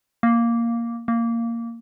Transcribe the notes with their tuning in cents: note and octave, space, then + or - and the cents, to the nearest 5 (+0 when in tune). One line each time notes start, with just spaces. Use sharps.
A#3 +0
A#3 -10